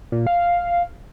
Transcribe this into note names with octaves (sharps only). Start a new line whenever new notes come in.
A#2
F5